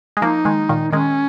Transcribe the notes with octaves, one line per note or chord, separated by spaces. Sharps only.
G#3
F3 A#3 D#4
D#3 G#3
A#2 D#3
D#3 G#3 C#4